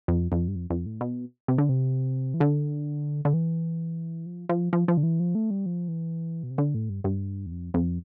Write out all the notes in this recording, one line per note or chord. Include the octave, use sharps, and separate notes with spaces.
F2
F2
G2
F2
F2
A2
B2
C3
D3
C3
E3
D3
D3
E3
F3
F3
F3
F3
D3
E3
F3
A3
G3
F3
E3
B2
C3
D3
A2
G2
G2
E2
F2
F2